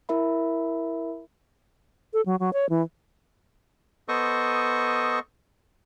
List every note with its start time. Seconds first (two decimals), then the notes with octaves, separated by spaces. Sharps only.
0.09 E4 A#4 E5 B5
2.13 A4
2.26 F#3
2.40 F#3
2.53 C#5
2.70 E3
4.08 B3 A4 C5 D#5 C#6 D#6